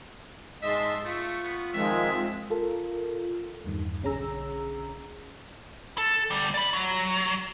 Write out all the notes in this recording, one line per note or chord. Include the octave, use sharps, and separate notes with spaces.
G#2 G#3 D#5 E5 A5 C6
A3 F4 C#6
B3
D#3 F3 G#3 C4 F4 E5
F4 A4 A#4
E2 G2 D#3
B1 D3 C#4 G#4 A#5 E6
A4
D3 G3
D5 B5
F#3